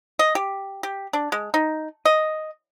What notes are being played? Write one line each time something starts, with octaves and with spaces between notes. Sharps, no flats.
D#5
G4
G4
D4
G#3
D#4
D#5